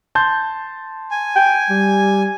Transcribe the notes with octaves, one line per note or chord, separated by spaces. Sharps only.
A5 C6 G6
G#5
G5
G3